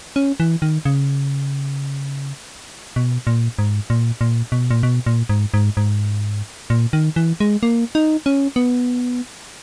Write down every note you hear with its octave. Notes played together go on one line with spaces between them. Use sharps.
C#4
E3
D#3
C#3
B2
A#2
G#2
A#2
A#2
B2
A#2
B2
A#2
G#2
G#2
G#2
A#2
D#3
E3
G#3
A#3
D#4
C#4
B3